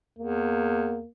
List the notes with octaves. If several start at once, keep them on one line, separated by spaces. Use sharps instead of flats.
E2 A#3